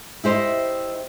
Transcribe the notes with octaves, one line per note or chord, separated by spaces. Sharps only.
E4 G4 C5 D#5